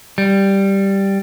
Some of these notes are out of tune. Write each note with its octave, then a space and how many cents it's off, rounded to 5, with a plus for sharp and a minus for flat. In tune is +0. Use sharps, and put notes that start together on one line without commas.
G3 +0